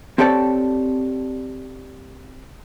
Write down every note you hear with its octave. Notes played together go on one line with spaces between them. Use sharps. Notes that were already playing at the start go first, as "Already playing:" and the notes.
C4 G4 A4 C#5 D5 A5